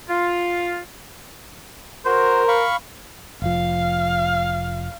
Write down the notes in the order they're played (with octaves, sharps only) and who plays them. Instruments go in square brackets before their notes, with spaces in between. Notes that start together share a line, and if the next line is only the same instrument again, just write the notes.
[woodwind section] F4
[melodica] F#4 [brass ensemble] A#4 [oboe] C5
[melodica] F5 B5 C#6
[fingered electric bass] F1 F3 [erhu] F5